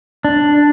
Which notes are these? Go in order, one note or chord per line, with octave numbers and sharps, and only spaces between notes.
D4